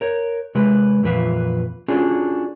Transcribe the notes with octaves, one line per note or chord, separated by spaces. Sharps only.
A#4 C#5
C3 G#3 B4
F2 A#2 E3 B4 E5 F5
C#4 D4 F4 F#4 G#4 A4